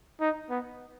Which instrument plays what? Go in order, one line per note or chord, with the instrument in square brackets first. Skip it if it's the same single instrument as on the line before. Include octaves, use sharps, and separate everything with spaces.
[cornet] D#4
B3